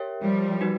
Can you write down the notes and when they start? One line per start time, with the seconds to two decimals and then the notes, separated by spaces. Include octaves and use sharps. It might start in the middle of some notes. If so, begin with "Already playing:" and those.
Already playing: G4 A#4 C#5 E5 G5
0.22 F3 G3
0.61 D#4 F#4 B4